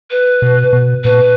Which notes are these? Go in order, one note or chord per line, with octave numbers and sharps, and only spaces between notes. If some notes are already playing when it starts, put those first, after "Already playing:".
B4
B2
B2
A#2 B4